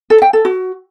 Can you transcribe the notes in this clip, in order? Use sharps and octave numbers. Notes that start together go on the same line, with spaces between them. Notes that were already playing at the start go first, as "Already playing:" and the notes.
A4
G5
A4
F#4